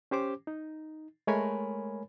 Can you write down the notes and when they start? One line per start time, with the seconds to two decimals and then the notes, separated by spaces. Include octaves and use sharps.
0.11 C#4 G4 C5 D6
0.47 D#4
1.27 G#3 A3 A#4 C#5 G#5 B5